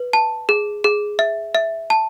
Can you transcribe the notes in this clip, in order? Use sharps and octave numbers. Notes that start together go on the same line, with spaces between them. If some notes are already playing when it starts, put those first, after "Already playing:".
Already playing: B4
A5
G#4
G#4
E5
E5
A5